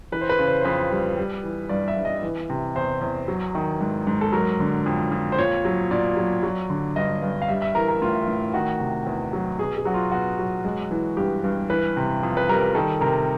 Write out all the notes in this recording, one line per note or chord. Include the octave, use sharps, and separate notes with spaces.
E3 B4
C5
B4
C#3
C5
C5
F2 B4
G3
G3
E3
G2 D5
E5
G2
D#5
E3
C3
E2 C5
E2
F#3
D#3
G#2
G#2
A4
F#3 A#4
D3
F2
F2
C5
A#2 C#5
F#3
A#2 D5
F#3
F#3
D3
G2 D#5
G2
F5
G3 E5
E5
E3 A#4
A#4
A2 F4
A2
D#3 F#4
C3
E2
F#3
B2 G#4
G#4
F#3 F#4
F4
B2 F#4
F#3
G#3
E3
G2 G4
G2
E3 B4
C3
F2
B4
G3 A#4
D#3 A4
C3 A#4